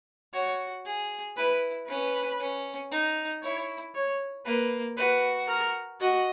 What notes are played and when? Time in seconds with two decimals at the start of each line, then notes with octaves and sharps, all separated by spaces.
0.33 F#4 C#5
0.85 G#4
1.37 E4 B4
1.88 C#4 B4
2.40 C#4
2.91 D#4
3.43 E4 C#5
3.95 C#5
4.45 A#3 B4
4.97 F#4 B4
5.48 A#4
6.00 F#4 D#5